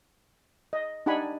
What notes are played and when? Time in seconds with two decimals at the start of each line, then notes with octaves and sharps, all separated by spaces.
0.73 D#5
1.06 D4 D#4 G4 F#5 G#5 B5